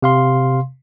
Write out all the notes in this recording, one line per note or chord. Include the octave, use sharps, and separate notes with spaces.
C3 F5 C6